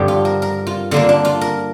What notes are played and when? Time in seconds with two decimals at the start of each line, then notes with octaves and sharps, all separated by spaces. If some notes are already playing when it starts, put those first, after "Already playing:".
Already playing: G2 D3 F3 G4 D5
0.08 F4
0.25 A#4
0.42 A#4
0.67 F4
0.91 D3 A#3 D4 F4
1.09 D4
1.25 F4
1.41 A#4